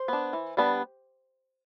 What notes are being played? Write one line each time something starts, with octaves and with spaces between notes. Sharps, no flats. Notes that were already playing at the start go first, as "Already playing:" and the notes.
Already playing: C5
B3 D4
E3
G3 B3 D4